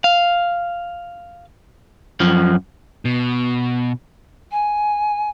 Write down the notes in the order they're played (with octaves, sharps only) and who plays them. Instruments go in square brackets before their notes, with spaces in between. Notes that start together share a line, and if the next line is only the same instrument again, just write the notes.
[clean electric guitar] F5
F#2 F3
[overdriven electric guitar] B2
[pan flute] G#5